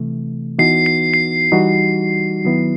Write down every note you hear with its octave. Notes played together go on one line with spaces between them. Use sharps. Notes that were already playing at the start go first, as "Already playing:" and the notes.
Already playing: C3 E3 A3
E3 B3 D#4 F#4 C7
C7
C7
E3 G3 D#4 F#4
D#3 F#3 B3 E4